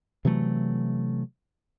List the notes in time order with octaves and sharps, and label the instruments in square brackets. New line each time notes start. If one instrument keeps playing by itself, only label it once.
[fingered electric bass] C3 E3 F#3 A3